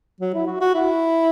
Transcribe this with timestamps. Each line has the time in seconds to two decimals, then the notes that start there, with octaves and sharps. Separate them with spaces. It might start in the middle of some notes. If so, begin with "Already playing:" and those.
0.20 F#3
0.34 E4
0.47 F#4
0.61 F#4
0.74 E4